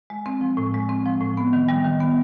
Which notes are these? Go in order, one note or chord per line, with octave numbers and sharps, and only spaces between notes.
G#3
C4
F3
A2
G#3
C4
F3
A2
B3
D#3
G3
D#3
B3